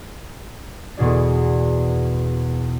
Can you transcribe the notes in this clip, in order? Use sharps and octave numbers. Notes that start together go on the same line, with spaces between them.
E2 B2 G#4 D5